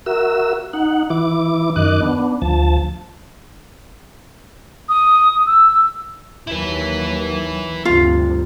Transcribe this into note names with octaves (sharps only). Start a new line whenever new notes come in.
F#4 A#4 E5 E6
D#4 F#5
E3 E4 D6
F#2 D#3 D#5 D6 F#6
B3 D4
D2 F3 A5
D#6
E6
D#2 F#3 E4 B4
D2 G2 C3 F4